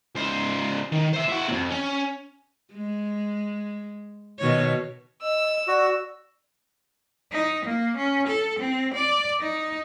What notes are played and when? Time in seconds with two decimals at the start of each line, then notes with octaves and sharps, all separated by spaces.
0.15 C#2 C5
0.92 D#3
1.13 C5 E5
1.29 E4 F#4
1.48 F2 A#2
1.70 C#4
2.73 G#3
4.39 B2 D#3 C#5
5.22 D#5 E6
5.68 F#4 D5
7.33 D#4
7.66 A#3
7.97 C#4
8.28 A4
8.60 C4
8.94 D5
9.41 D#4